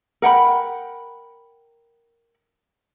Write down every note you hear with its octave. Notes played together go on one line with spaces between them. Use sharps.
A#4 F#5 G5 B5